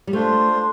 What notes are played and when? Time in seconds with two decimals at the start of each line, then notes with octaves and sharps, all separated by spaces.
0.07 G3
0.13 A3 D4 F4 C5